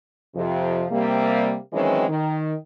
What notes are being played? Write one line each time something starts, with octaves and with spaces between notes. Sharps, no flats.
F2 C3 F3
C3 G3 A#3
D#3 E3 F#3 G#3 C4 C#4
D#3